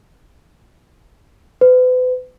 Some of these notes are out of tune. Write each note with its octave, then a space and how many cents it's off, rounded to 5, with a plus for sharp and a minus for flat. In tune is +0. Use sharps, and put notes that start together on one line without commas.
B4 +40